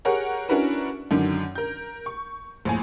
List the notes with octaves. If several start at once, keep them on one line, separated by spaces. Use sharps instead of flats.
G4 G#4 A#4 C#5 F#5
C#4 D4 E4 F#4 A#4 B4
F#2 D3 D#3
A#4 G6
C#6
A#1 A2 G#5